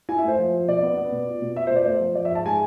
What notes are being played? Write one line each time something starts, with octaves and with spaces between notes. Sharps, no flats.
E4 G#5
E5
A3 C5
F3
F3
B2 D5
B3
B3
B2
F4
B2
F4 E5
C5
B2 D5
A3 C5
F3
F3 D5
E5
G#2 A5
G#3 G#5